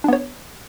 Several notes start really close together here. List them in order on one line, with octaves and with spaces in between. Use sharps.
D4 B3 C#5